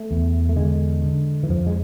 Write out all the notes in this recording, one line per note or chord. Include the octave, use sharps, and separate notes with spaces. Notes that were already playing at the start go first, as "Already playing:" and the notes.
Already playing: A3
E2
A3
D3 G#3
D3
E3
F2 F3
G#3